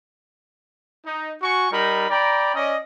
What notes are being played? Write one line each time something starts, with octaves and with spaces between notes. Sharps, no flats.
D#4
F#4 G#5 C#6
G3 D#4 A#4 B5
D5 G5 A#5 B5
C#4 D5 D#5